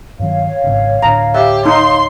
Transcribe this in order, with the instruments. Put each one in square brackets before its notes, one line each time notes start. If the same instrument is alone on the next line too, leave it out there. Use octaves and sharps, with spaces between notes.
[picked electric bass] G2 D#3 F#3 [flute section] C#5 F5
[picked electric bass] G#1 G#2 C#3
[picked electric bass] D2 A2 D4 [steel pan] A#5
[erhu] G4 [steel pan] E5
[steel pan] D#4 [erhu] C6